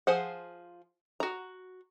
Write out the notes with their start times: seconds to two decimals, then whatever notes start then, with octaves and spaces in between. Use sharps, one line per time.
0.07 F3 G#4 C5 F#5
1.20 F#4 A#5